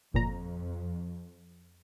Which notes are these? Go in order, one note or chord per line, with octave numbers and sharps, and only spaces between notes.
G1 F2 A#2 A#5